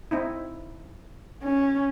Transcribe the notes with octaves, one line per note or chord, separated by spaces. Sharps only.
C4 D#4 E4
C#4